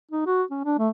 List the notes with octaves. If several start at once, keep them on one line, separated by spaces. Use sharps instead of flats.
D#4
F#4
C#4
D4
A3